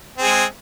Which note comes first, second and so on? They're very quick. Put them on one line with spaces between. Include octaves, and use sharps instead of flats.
C4 G#4 G#3